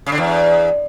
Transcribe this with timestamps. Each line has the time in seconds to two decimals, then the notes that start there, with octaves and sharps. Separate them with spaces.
0.06 C#3
0.12 D3
0.18 E2